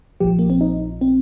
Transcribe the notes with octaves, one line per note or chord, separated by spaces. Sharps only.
A#1 A#2 F3 G4
A#3
C4
D#4
C4